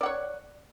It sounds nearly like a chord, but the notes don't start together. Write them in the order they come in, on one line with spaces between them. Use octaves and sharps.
D5 F#5 C#5